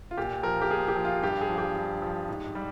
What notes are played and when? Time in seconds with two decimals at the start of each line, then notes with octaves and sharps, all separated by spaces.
0.11 F4
0.17 A#2 G4
0.43 F3 A#4
0.62 G4
0.71 A#2 G#4
0.88 G4
0.96 F3
1.05 F4
1.23 G2 G4
1.41 G#4
1.49 F3
1.58 G4
1.75 G2
2.02 F3
2.29 G#2
2.55 G3